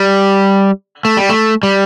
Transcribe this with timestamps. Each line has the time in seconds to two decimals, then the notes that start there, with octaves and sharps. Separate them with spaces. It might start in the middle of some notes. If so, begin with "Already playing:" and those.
Already playing: G3
1.05 A3
1.17 G3
1.29 A3
1.63 G3